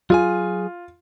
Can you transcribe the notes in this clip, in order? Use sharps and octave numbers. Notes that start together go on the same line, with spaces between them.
F#3 F4 G#4 G#5